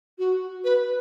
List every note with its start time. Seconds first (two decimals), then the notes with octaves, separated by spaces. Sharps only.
0.19 F#4
0.64 B4